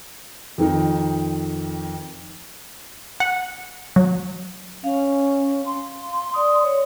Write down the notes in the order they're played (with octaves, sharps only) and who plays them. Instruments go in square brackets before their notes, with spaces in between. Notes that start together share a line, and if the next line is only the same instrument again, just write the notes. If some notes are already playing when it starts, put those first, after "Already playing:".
[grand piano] F2 D#3 D#4
[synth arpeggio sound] F#5
F#3
[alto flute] C#4 [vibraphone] F5
[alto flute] C6
[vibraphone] D5 D#6
C#5